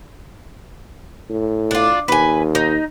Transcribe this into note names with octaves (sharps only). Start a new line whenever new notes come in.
A2
D4 F4
D#2 B4 G#5
D#4